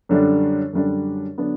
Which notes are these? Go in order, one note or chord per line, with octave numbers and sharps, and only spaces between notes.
F#2 D3 G3 D4
F#2 D3 G3 D4
D3 F#3 B3 D4